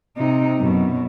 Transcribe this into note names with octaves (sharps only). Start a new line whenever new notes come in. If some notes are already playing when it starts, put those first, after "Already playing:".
C3 D#4
F#2 B2